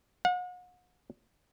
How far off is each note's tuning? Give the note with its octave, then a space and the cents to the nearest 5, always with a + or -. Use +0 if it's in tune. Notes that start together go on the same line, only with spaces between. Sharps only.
F#5 -40